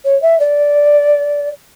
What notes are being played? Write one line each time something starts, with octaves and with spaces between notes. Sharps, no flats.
C#5
E5
D5